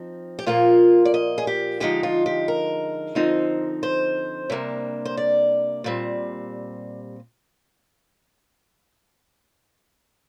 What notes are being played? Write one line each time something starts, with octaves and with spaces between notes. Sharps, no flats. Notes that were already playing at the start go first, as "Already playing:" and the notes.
Already playing: F3 C4 D#4
G4
A#2 F3 A#3 F4
D5
D#5
G#4
G4
D3 F3 G#3 D#4 G4
F4
G4
A#4
D3 F3 C4 D#4
C5
C3 G3 A#3 D4
C5
D5
A#2 G3 C4